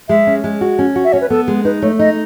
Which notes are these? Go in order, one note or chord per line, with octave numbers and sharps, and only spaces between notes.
G#3 E5
C#4
G#3
F#4
C#4
F#4
E5
C#4 C#5
B4
B3 A4
G#3
D#4 B4
A3 C#5
D#4 D#5